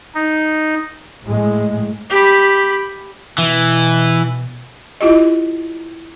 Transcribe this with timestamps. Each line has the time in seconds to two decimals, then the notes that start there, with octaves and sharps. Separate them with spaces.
0.15 D#4
1.25 A2 G#3
2.10 G4 B5
3.38 B2 E3
5.01 E4 F4 G4 D#5